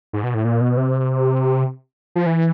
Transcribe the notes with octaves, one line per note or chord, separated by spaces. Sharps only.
G#2
B2
A2
A#2
B2
C3
F3
E3